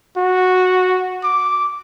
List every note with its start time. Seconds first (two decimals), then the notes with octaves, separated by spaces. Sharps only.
0.17 F#4
1.24 D6